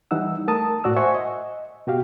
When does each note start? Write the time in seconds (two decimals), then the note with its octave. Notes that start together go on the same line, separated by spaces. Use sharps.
0.11 E3 G3 D#4 F#5 E6
0.48 A3 A#4 A5 D#6
0.84 A2 F#4 D5 E6
0.97 C5 E5 F#5 G#5 C#6
1.15 D#5
1.87 B2 F#4 G4 F5